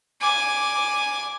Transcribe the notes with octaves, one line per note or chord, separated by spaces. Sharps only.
G#5 D6